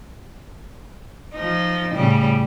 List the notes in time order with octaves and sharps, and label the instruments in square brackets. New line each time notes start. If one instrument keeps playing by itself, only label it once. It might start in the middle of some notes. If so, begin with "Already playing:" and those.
[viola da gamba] F3 D#4
A2 C#3 G3